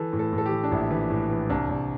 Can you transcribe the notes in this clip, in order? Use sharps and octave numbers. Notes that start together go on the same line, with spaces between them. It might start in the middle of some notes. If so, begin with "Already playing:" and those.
Already playing: E3 A4
A2
A4
A2
A4
G4
E3
D4
A#1 E4
E3
A2
E3
C2 D4
C2